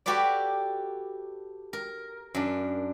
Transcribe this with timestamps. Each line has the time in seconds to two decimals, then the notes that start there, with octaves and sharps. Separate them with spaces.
0.06 F#4 G4 A4 B4 D5
1.73 A#4
2.35 F#2 D4